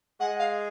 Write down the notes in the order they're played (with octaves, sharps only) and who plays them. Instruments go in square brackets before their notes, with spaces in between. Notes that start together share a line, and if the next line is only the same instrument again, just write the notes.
[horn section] G#3 [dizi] F#5
[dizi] F5